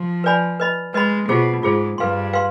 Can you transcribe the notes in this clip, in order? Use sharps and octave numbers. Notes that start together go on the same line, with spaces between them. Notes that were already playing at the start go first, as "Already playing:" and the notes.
Already playing: F3
B4 D5 G#5 B5
B4 D#5 B5
G#3 B4 D#5 B5
B2 F4 G#4 C5
G#2 F4 G#4 C5
G2 B4 F5 C6
B4 F5 C6